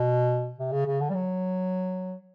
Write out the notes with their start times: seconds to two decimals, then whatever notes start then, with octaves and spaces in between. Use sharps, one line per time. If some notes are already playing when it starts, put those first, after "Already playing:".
Already playing: B2
0.58 C3
0.72 C#3
0.86 C#3
1.01 D3
1.10 G3
1.15 F#3